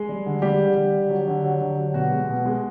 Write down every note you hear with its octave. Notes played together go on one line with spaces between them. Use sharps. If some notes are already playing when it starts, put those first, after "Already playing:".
Already playing: G#3 G#4
G3
D3
G3 G4
D3
G3
D3
F#3
D3
F#3
D3
F#3
B2 F#4
G#3
B2
G#3